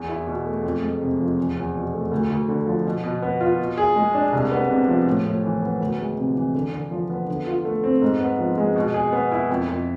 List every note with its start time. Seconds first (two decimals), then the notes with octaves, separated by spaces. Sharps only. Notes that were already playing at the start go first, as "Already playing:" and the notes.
Already playing: E2
0.08 E4
0.27 B2
0.46 A3
0.63 F2
0.82 G#3
1.01 C3
1.19 F3
1.37 E2
1.56 E2
1.75 B2
1.93 A3
2.11 D2
2.30 D2
2.48 D3
2.67 F3
2.85 B2
3.04 B2
3.22 B3
3.41 F4
3.59 B2
3.78 G#4
3.96 G#3
4.14 D4
4.33 C2
4.51 B3
4.70 C3
4.88 F3
5.07 A2
5.25 A2
5.44 E3
5.62 B3
5.81 D2
5.99 G#3
6.18 C3
6.36 E3
6.54 D3
6.73 D3
6.91 F3
7.10 B3
7.28 D3
7.46 F4
7.65 A3
7.84 C4
8.02 G#2
8.20 B3
8.39 F3
8.58 G#3
8.76 B2
8.94 G#4
9.13 B3
9.32 E4
9.49 F2
9.68 F2